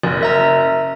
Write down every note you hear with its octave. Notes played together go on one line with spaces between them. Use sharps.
F#1
A#4 E5 A#5